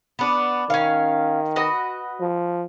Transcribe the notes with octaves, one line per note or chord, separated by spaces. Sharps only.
B3 D4
D#3 C#4 F5
F#4 B4 D#5
F3